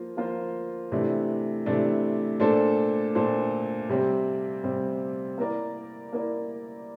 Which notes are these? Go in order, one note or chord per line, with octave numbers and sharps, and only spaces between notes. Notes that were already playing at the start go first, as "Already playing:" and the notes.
Already playing: F3 A#3 F4 C5
F3 A#3 F4 C5
C3 E3 A3 D4
C3 E3 A3 D4
A#2 A3 D4 A4 C5
A#2 A3 D4 A4 C5
C3 G3 C4
C3 G3 C4
A#3 E4 A#4 D5
A#3 E4 A#4 D5